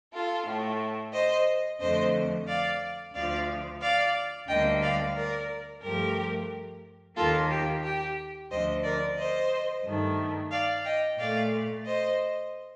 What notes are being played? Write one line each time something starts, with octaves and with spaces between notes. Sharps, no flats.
F4 A4
A2 A3
C5 D#5
F2 D3 A3 C5 D#5
D5 F5
D2 D3 F3 D5 F5
D5 F5
D2 D3 G3 A#3 D#5 G5
D5 F5
A#4 D5
G2 F3 A3 G4 A#4
D#2 D#3 A#3 F4 A4
G4
G4
D2 D3 F3 C5 D#5
A#4 D5
C5 D#5
G2 D#3 A3
D5 F5
D#5 G5
A#2 A3 D5 F5
C5 D#5